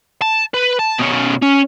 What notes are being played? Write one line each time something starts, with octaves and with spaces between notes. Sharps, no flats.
A5
B4
A5
B2 C#4
C#4